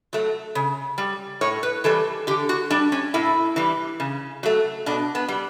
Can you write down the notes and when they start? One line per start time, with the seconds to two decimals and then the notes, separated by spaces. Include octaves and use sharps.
0.13 F#3 A3
0.55 C#3
0.98 G3
1.41 A2 C#5
1.63 B4
1.84 E3 G3 A4
2.27 D3 G4
2.49 F#4
2.70 G3 D4
2.92 C#4
3.14 A2 E4
3.56 E3 G3
4.00 C#3
4.43 F#3 A3
4.86 B2 D4
5.15 B3
5.29 G3